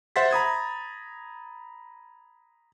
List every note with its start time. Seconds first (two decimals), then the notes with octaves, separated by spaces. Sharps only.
0.16 C5 E5 F#5 C6 A6 B6
0.31 A#5 B5 D#6 G#6